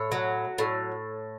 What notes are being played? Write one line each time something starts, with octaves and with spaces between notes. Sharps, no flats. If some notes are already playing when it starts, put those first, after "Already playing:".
Already playing: A2 C#5
F#3
A2